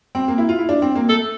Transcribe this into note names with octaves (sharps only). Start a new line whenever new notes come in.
C4
A#3
E4
F4
E4
D4
C4
A#3
A3 A4